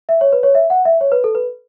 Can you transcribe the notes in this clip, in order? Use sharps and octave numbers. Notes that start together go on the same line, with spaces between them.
E5
C#5
B4
C#5
E5
F#5
E5
C#5
B4
A4
B4